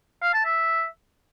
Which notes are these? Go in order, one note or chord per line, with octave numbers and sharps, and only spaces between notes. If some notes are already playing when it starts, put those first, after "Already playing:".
F5
A5
E5